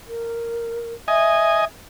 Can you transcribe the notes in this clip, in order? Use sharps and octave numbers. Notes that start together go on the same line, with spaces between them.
A#4
D#5 E5 G#5